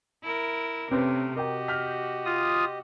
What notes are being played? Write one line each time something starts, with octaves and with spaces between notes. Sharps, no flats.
E4 A#4
C3 A3 C4 C#4 G4 A#4 B4
F#4 G4 A#4 D#5 G5
F6 G6 B6
F4 D#6